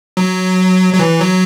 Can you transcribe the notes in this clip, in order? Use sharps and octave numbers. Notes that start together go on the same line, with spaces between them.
F#3
F#3
E3
F#3